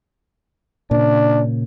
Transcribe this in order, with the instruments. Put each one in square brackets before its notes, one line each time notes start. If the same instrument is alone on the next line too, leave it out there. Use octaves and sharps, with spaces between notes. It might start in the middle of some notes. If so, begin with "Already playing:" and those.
[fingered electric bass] A#2 C#3 [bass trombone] D4